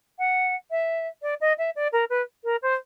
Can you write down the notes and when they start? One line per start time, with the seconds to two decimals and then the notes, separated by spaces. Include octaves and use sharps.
0.19 F#5
0.71 E5
1.22 D5
1.41 D#5
1.58 E5
1.76 D5
1.93 A#4
2.10 B4
2.44 A#4
2.62 C5